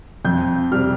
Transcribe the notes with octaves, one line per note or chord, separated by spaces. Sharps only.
F2 G6
C3 G3 F6